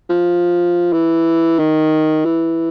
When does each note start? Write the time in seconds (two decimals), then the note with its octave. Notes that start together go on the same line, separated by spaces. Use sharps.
0.10 F3
0.93 E3
1.59 D#3
2.25 E3